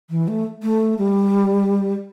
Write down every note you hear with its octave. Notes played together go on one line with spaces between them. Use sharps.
E3
A3
A3
G3